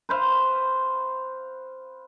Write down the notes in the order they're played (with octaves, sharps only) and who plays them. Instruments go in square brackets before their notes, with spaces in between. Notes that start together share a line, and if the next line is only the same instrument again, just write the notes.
[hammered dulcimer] B4 C5 F5